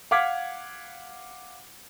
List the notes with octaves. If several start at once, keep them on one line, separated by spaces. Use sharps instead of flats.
F5 F#5 D6 F6 G#6 B6